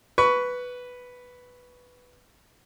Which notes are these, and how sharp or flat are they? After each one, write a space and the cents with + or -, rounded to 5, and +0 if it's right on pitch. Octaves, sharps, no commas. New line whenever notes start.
B4 +0 C#6 +20